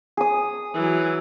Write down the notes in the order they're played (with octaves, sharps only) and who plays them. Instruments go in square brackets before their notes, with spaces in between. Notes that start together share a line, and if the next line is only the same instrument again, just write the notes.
[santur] G#4 D#6
[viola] E3 F#3